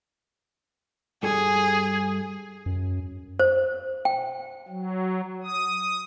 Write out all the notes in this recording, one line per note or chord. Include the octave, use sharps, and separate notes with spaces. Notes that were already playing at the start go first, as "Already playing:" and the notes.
G2 G#4 A4 G#5
F#2
C5
G5
F#3
D#6